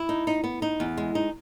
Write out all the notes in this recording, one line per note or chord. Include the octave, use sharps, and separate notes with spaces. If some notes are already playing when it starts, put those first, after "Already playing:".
Already playing: E4
D#4
D#4
B3
D#4
E2
G#3
D#4